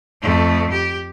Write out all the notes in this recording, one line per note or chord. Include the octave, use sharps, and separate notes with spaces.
F2 A3
G4